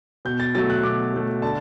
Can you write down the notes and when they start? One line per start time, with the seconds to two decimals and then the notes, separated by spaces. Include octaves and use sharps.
0.25 B2 G6
0.40 A6
0.55 F#3 A3 A6
0.70 F#6
0.83 B2 D6
1.13 F#3 A3
1.42 D3 A5